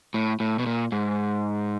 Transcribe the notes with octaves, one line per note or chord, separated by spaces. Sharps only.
A2
A2
B2
A#2
G#2